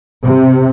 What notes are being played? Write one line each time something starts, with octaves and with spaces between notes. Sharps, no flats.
C3